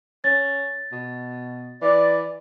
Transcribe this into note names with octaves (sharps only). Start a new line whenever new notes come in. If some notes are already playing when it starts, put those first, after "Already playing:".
C#4 A6
B2
E3 D5